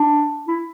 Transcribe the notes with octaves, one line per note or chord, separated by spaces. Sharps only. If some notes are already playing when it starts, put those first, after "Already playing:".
Already playing: D4
E4